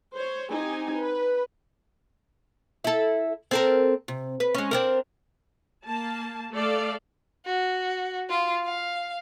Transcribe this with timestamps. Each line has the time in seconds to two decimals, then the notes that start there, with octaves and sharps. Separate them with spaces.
0.14 C5 C#5
0.51 C4 D#4 G4 G#5
0.97 B4
2.84 E4 A4
3.51 C4 A4 A#4
4.08 C3
4.40 B4
4.54 G#3 C#4
4.71 C4 D4 A#4
5.86 A#3 A5
6.53 A3 A4 D5 F5
7.46 F#4
8.30 F4
8.65 F5